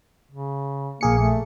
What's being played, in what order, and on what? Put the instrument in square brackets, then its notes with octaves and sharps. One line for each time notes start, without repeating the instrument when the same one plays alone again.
[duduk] C#3
[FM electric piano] A#1 G#4 C#7 [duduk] A#3
[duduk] A3